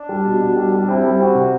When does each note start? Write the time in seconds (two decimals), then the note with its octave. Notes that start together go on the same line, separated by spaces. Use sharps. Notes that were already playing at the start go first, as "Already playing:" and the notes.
Already playing: D4
0.09 G3
0.25 B2
0.41 B2
0.57 G3
0.72 G3
0.88 C4 E4
1.04 G3
1.19 C4 F#4
1.35 C3